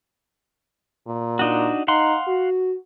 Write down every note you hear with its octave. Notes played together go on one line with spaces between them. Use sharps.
A#2
D4 D#4 F#4
D#4 F5 F#5 C6
F#4